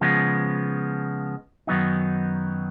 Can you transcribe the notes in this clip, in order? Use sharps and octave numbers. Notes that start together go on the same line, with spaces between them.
C#3 F3 G#3 B3
F#2 D#3 F#3 B3 D#4